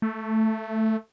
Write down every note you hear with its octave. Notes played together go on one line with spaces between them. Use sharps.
A3